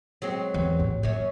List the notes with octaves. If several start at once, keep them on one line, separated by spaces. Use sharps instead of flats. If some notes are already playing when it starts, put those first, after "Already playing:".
F#3 G#3 C4
E2
A1
F#2 A#2 C#4